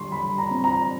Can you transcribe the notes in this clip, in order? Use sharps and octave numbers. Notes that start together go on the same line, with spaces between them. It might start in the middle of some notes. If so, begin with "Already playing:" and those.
Already playing: D3 G3 C6 C#6
G3 B5
A#5
C4
A#5